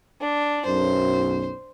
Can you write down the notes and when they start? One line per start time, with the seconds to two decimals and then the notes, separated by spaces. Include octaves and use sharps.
0.21 D4
0.66 B1 F#2 C5